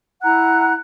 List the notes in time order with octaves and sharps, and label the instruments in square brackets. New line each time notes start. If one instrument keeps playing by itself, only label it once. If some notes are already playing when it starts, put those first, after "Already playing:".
[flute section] E4 F#5 A#5 F#6